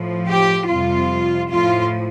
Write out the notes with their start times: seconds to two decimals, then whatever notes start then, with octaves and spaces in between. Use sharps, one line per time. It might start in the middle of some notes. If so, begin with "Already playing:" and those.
Already playing: A2 F3
0.28 G4
0.68 F2 C3 G3 F4
1.49 A2 F3 F4